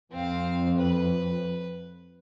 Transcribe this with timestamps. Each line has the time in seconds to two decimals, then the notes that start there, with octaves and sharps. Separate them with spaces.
0.12 F2 C4 F5
0.78 B4